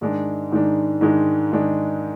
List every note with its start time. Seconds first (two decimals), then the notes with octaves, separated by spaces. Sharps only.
0.01 G#2 D#3 G#3 D4
0.51 G#2 D#3 G#3 D4
1.01 G#2 D#3 G#3 D4
1.52 G#2 D#3 G#3 D4